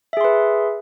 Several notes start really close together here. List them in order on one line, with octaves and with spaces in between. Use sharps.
E5 G#4 C6 B4